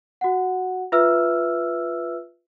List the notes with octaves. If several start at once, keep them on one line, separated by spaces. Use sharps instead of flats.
F#4 F#5
F4 B4 E5 E6 F6